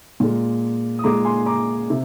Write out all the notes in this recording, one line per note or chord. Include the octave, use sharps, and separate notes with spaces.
A#2 G#3
D#6
A#2 G#3 A#5 D6
G#5 C6
A#5 D6
C3